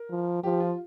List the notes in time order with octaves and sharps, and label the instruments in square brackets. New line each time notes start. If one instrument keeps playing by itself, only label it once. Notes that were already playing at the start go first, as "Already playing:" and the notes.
Already playing: [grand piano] A#4
[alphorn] F3
[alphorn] F3 [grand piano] G4
[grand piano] F4